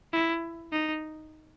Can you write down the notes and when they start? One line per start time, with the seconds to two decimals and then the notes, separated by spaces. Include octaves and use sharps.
0.13 E4
0.72 D#4